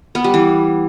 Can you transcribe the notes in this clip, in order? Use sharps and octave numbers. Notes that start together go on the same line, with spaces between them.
B3
G3
E3